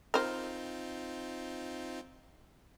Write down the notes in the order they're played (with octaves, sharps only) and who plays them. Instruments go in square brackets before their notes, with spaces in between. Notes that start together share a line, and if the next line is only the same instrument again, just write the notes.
[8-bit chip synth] C4 D#4 F4 [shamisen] A#4 C5